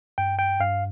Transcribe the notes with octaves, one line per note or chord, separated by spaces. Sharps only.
G2 G5
G5
G2 F5